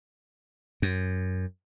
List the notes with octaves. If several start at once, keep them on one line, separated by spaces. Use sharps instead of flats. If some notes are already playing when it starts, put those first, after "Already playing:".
F#2